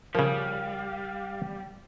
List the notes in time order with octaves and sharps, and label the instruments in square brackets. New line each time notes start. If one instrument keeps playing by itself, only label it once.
[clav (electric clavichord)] C#3 F3 [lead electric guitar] G3 [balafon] A#4 [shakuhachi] F5